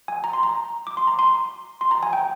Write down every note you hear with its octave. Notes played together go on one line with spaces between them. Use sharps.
G#5
A#5
C6
A#5
D6
C6
A#5
C6
C6
A#5
G#5
G5